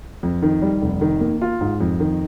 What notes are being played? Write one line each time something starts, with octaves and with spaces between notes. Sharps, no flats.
F2
D#3
G3
F1
D#3
A#3
F4
G#2
F2
D#3